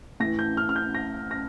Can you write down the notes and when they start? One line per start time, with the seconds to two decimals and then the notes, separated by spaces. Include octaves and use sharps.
0.20 A2 E3 A#6
0.39 G6
0.57 F6
0.69 F6
0.76 G6
0.95 A#6
1.31 A#6